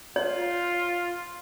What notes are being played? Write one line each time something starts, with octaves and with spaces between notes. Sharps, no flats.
F4 C#5